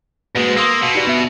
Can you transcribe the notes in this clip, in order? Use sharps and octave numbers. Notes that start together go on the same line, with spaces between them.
G#2 G#3 A#3 F#4 B4
A#3 C6 D#6 E6
B2
D#4 G4 D5
B3 E5